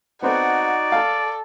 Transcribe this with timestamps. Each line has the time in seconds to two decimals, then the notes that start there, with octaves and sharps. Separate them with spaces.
0.23 B3 C4 D#4 F#4 A4 D5 F#5
0.92 A4 F5